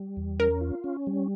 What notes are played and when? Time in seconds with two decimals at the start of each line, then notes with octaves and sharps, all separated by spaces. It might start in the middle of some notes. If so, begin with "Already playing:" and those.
Already playing: G3
0.17 E2
0.39 C#4 A#4
0.61 F4
0.84 C#4
1.07 G3